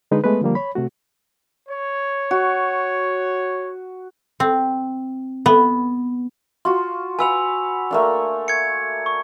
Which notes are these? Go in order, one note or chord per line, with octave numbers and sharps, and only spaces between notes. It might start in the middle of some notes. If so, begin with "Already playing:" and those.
D3 G#3 D#4 G#4 B4
G#3 A3 B3 B4
D3 F3 G3 A#3
C#5 B5
C3 A3 F#4
C#5
F#4
C4
B3
F4 F#4 C6
B4 F#5 G#5 E6 F7
A3 A#3 D4
G#6 C#7
C#6